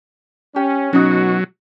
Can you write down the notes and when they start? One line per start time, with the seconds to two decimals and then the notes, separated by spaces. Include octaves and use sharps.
0.56 C#4 G4
0.93 B2 F#3 C#4 D#4 F#4